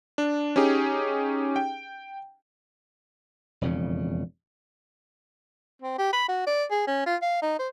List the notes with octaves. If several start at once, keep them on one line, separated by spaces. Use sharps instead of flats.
D4
C#4 D#4 G4 G#4
G5
E1 F2 C#3
C4
G4
B5
F#4
D5
G#4
C#4
F4
F5
D#4
C5